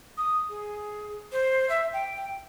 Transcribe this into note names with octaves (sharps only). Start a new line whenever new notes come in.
D#6
G#4
C5
E5
G5